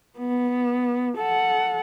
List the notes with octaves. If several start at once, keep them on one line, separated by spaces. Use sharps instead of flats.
B3
A4 F#5